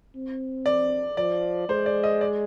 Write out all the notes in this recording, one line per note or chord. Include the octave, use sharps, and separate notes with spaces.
C4
D5
F3 D5
G#3 C5
D5
D#5
D5